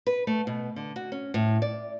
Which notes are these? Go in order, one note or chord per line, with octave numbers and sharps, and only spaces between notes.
B4
A3
B2
D3
F#4
C#4
A2
D5